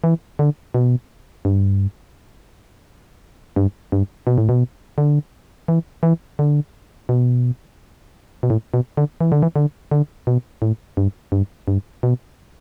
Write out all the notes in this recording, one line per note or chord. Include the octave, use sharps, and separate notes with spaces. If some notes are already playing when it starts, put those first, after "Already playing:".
E3
D3
B2
G2
G2
G2
B2
A2
B2
D3
E3
E3
D3
B2
B2
A2
B2
D3
E3
D3
E3
D3
D3
B2
A2
G2
G2
G2
B2